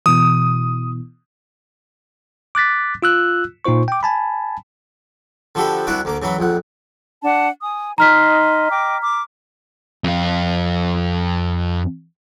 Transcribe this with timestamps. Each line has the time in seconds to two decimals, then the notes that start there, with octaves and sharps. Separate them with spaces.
0.06 B2 E3 D#6
2.55 D6 F#6 A6 B6
3.02 F4 E6 F#6
3.65 A#2 D#4 F4 C5 C#6
3.88 G5 D6
4.03 G#5 A5 B5
5.55 D3 F3 F#4 G4 A4 B5
5.87 C2 D4 E4 F#4 F#5 D6
6.05 D2 A#3 D6
6.22 C#3 E3 F#3 B5
6.39 A#1 F2 F#5
7.24 D4 F#5 A5
7.63 G#5 D#6
7.98 D#4 D#5 A#5 C6 F6 B6
8.71 D#5 G5 D6
9.01 D6
10.04 F2 F5